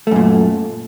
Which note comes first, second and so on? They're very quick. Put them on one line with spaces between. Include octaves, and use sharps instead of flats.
A3 F#2 A#2